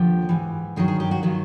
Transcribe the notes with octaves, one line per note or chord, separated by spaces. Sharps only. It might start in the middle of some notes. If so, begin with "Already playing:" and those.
Already playing: D#2 D3 F3 G4
G#2 E3
G2 D#3 F#3 G#4
G#4
G4
F#4
D#3 F#3 F4